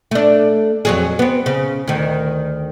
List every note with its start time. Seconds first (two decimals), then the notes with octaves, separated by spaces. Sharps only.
0.11 A3 D4
0.85 F2 F#3 G#4
1.19 B3 C4
1.46 C#3
1.87 D2 D#3